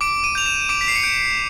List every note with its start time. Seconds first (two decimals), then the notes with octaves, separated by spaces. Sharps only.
0.01 D6 D7
0.24 D#7
0.35 G6 F7
0.46 E7
0.69 D6 D7
0.81 B6
0.88 C7
0.95 C#7
1.03 G6 D7